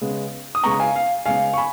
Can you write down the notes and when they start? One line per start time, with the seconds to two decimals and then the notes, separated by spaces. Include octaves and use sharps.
0.01 C#3 G#3 B3
0.55 D#6
0.64 C#3 G#3 B3 A#5 C#6
0.79 F5 G#5
0.96 F5
1.26 C#3 G#3 B3 F5 G#5
1.53 C#6
1.57 G#5 B5